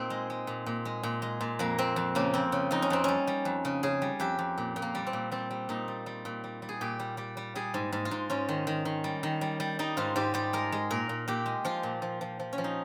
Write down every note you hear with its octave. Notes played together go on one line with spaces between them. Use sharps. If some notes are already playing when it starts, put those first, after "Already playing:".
Already playing: A#2 C4 D#4
G#3
G#3
A#2
A#2
G#3
A#2
G#3
A#2
F2 A#3
F2 C4
F2
C#3 A#3
F2 C4
C#3
F2 D#4
C#4
F2 C4
G3 C#4
G3
F2
C#3
C#3 G#4
G3
F2 G4
F2
A#2
A#2
A#3
G3
C4
A#2
G3 C4
G3
A#2 D#4
G3
G3
A#2
G3
G3
G#4
A#2 G4
G3
G3 G4
G3
G3 G#4
G#2
G#2
F4
G#2
G#2 C#4
D#3
D#3
D#3
G3
D#3
G3
G3
G3 D#4
G#2 F4
G#2 G4
G3 G4
G#3 A#4
G#3
A#2 A#4
A#2
A#2 G4
G#3
F3 F4
A#2
F3
F3
F3
C#4
F3
D#4